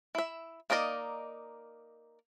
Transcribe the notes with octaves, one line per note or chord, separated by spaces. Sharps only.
E4 E5
A#3 D#4 A#4 D5 D#5